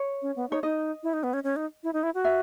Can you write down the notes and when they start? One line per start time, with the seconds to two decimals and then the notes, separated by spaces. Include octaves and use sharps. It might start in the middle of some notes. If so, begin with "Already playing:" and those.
Already playing: C#5
0.22 C#4
0.36 B3
0.50 D#4 C#5
0.63 D#4 D#5
1.03 E4
1.13 D#4
1.23 B3
1.33 C#4
1.44 C#4
1.56 D#4
1.83 E4
1.93 D#4
2.03 E4
2.14 F#4
2.24 E5